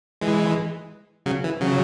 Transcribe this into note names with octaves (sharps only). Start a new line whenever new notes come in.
E3 G#3
C#3 F#3
E3
C#3 F#3